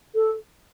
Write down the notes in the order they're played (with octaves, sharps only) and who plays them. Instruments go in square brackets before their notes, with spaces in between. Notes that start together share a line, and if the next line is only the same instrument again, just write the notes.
[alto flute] A4